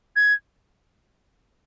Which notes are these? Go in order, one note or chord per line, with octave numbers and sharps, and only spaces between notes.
G#6